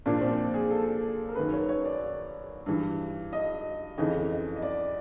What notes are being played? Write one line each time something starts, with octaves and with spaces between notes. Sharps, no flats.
A#2 F3 D4
C4
G#4
A4
A#4
F#2 D#3 B4
C#5
C#5
D5
G2 E3
D#5
F2 C#3 E3 D#5
D#5
D#5
D5